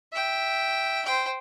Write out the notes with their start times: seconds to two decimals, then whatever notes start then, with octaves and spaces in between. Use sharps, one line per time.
0.12 E5 G5
1.05 C5 G5